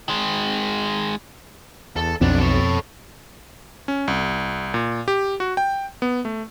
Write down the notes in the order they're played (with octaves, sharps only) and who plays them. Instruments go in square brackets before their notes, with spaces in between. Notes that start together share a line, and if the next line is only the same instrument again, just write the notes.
[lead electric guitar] D#3 G#3
[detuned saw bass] E2 [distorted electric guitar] A4
[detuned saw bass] B1 [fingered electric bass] F2 B2 C4 [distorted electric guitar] B3 D4
[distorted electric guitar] A4 C#5
[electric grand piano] C#4
C2
A#2
G4
F#4
G5
B3
A3